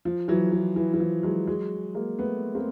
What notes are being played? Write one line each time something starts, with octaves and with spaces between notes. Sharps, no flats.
F3
E3 F#3
E3
E3
E3
F3
F#3 G#3
F#3 G#3
G#3 A#3
A3 B3
A#3 C4